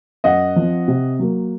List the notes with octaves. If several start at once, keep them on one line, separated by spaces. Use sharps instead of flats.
F#2 D#5 F#5
F3 C4
C3
F#3 A#3